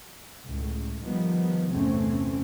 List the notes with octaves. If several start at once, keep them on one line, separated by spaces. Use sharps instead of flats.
C#2 A2
D#3 F3 G3 B3
G1 E2 C3 A3 C4 C#4